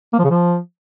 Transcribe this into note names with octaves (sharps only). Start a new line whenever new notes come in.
A#3
F3
C#3
F3